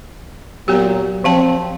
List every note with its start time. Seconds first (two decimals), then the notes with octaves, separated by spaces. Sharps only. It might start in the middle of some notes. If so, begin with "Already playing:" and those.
0.68 A#2 F#3 B3 F#4 G4
1.24 F3 C4 F5 A5